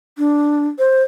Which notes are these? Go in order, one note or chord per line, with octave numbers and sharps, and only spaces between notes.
D4
C5